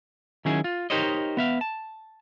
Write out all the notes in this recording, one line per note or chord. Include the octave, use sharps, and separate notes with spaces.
D#3 F#3 C#4 E4 G#4
F4
D#4 G4 A#4 C5 C#5 D#5
B3 E5 F5
A5